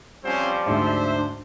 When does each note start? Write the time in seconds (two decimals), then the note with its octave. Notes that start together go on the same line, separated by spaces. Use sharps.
0.24 F3 G3 C4 C#4 C5
0.66 D2 G#2 D4 C5 E5